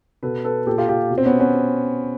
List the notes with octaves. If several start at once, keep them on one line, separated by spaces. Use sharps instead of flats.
B2 A4 B4
A4 B4
A#2 G4 A4
F4 G4
F4 G4
B2
C4
B3 C#4
B3 C#4